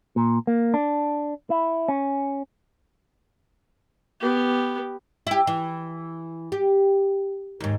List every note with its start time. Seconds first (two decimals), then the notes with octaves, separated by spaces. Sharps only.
0.16 A#2
0.47 A#3
0.74 D4
1.50 E4
1.88 C#4
4.20 B3 G4
5.27 E4 G4
5.47 E3
6.52 G4
7.60 D#2 G#2